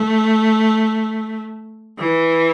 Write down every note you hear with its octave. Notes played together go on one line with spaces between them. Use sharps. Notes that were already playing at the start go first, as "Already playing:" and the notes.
Already playing: A3
E3